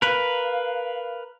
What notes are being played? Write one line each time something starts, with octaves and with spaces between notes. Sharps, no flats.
A#4 B4 F5